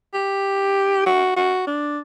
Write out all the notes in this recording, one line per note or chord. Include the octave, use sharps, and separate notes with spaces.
G4
F#4
F#4
D4